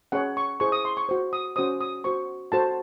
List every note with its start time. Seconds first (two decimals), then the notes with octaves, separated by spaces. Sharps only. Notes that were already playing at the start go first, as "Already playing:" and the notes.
0.12 C#4 G#4 C#5 F#5
0.37 C#6
0.60 E4 G#4 C5 C#6
0.72 D#6
0.85 C6
0.97 C#6
1.09 F#4 C5
1.33 D#6
1.56 C#4 F#4 C5 D#6
1.81 D#6
2.04 F#4 C5 C#6
2.52 F#4 A4 C5 A5